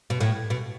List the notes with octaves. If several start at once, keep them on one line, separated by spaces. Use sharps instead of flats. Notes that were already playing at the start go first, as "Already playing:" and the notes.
B2
A2
B2